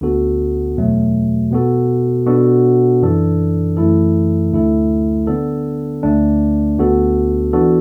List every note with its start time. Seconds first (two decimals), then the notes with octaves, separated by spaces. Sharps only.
0.01 D2 D3 B3 F#4 A4
0.77 E2 B2 F#3 A3
1.51 B2 B3 F#4 A4
2.26 B2 B3 D4 F#4 A4
3.02 F#2 E3 D4 A4
3.77 F#2 E3 A3 E4 A4
4.52 D2 D3 A3 E4 A4
5.27 D3 B3 D4 A4
6.03 D2 D3 A3 D4
6.78 D2 D3 B3 F#4 A4
7.53 E3 B3 D4 F#4 A4